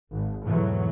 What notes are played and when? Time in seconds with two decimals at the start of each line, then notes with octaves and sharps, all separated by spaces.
0.11 G#1
0.45 E2 G#2 B2 E3 F#3 A3